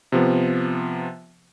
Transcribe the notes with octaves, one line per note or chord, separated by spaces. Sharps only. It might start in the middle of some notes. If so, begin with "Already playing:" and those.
C3 F3 B3